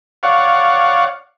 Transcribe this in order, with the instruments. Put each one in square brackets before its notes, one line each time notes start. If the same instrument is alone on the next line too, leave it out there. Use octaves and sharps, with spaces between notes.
[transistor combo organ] C#5 D5 F5 F#5